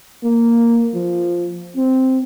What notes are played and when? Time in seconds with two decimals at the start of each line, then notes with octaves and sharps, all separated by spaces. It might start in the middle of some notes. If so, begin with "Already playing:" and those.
0.24 A#3
0.95 F3
1.77 C4